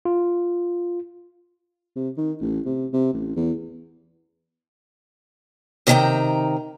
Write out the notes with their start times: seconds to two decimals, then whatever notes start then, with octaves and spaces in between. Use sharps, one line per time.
0.05 F4
1.96 C3
2.18 D#3
2.41 A1
2.66 C3
2.93 C3
3.13 A1
3.36 E2
5.87 C3 D#3 F#4 G#4 G5 A#5